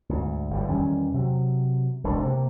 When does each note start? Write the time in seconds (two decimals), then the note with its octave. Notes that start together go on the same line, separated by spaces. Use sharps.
0.09 D2 G#2
0.50 G1 A2 G3
0.69 E2 D#3 G3 C#4
1.14 C3 F#3
2.04 E1 C#2 F#2 D4
2.22 C3 A#3